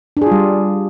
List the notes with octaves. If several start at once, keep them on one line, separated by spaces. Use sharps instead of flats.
G3 D4 F4 G#4